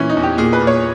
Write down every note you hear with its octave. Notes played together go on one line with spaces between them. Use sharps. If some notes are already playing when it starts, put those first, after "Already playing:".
Already playing: A#2 E3 C#4
D#4
E2
G4
A#2 G#4
B4
A#2
C#5